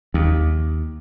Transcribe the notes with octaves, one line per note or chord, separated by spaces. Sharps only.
D#2